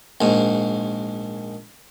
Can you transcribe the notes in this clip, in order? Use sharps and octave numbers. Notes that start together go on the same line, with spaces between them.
A#1 G#2